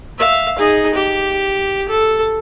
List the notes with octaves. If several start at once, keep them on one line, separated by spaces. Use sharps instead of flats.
E5 F5
D#4 G#4
G4
A4